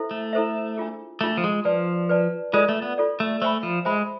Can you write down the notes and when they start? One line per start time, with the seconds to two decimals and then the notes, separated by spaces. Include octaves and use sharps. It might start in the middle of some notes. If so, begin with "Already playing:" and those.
Already playing: E4 A4 C5 E5
0.11 A3
0.33 E4 A4 C5 E5
0.77 D4 F4 G#4
1.21 A3 D4 F4 G#4
1.37 F3
1.44 G#3
1.65 F3 B4 D5 A5
2.09 B4 D5 A5
2.53 G#3 F4 A4 D5
2.69 A3
2.82 B3
2.98 F4 A4 D5
3.20 A3
3.42 A3 C5 E5 G#5 B5
3.63 F3
3.85 G#3 C5 E5 G#5 B5